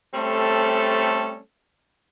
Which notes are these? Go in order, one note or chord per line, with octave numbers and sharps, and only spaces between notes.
G3 A3 C4 C#4 A4